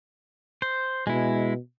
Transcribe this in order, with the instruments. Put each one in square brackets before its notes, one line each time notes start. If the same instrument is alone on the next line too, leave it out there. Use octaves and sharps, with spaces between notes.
[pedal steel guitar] C5
[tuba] B2 [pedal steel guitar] G#3 E4